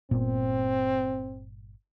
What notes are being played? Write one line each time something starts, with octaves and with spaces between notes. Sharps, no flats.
G1 A#2 B3 C4